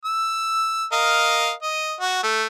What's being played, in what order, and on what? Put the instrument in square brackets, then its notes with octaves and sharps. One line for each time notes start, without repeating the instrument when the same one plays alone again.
[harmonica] E6
A#4 D#5 F5
D#5
F#4
A3